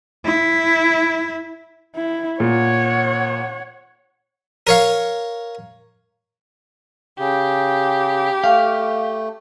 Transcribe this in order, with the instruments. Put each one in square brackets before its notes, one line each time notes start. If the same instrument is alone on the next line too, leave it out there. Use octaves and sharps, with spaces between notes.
[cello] E4
[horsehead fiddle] E4
[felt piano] A#2 [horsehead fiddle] C#5 F#5
[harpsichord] A#4 C#5 F5
[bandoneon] C#3 [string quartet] G4
[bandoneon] A3 [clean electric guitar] F5